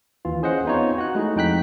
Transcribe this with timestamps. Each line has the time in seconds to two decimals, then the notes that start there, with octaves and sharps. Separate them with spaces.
0.25 D#2 E3 F4
0.42 C#4 G#4 C5 D#5 F#5
0.65 B3 C4 D#4 F4 C#5
0.98 F#4 F#6
1.15 G#3 A3 D#4 E4 G#4
1.36 F2 D#4 G5 F#6 B6